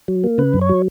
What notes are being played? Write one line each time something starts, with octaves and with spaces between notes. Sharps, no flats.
F#3
A#3
C#3 B4
F#2
C#5
F#3